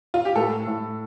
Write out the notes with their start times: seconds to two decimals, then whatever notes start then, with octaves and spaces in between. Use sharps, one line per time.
0.14 F4
0.25 G4
0.36 A2 A4
0.67 A2